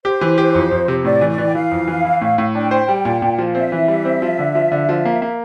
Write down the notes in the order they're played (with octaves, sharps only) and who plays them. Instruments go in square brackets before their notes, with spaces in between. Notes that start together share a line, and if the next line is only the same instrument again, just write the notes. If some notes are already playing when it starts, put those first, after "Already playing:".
[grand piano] G4 [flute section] C5
[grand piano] E3
G4
F2
F2
C3
[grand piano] A2 [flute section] D5
[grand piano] E3
[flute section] D5
[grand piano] E3
[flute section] G5
[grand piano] E3 [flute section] F5
[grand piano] F2
E3
E4
A2
A2
[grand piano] D4 [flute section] G5
[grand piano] C5
G3
A#2
A#2
F3
[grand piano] C4 [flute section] E5
[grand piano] E3
G3
C4
F3
D3
F3
D3
F3
A#3
A#3